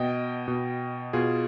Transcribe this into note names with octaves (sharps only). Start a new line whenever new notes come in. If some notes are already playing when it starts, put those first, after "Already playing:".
Already playing: B2 D#5 G5
B2
B2 F4 G#4